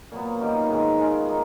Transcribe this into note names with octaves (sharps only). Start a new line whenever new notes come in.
A#2 F#3 B3
F#2 D#3 G3
G#2 D#3 G#3
D#3 G#3 C#4 F4
A#3 D#4